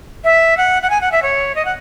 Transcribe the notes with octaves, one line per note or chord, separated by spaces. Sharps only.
E5
F#5
F#5
G#5
F#5
E5
C#5
D#5
F#5